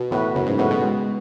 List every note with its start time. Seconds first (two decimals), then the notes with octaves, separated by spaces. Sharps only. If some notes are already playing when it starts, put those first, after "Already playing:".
Already playing: B2
0.11 A2 E3 B3 F#4 B4
0.35 F#2 C#3
0.47 G#2
0.58 A2 E3 B3 F#4 B4
0.71 B2
0.82 G#3